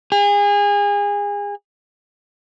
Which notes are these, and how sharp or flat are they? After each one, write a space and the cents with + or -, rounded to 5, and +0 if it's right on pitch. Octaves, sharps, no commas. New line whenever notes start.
G#4 -30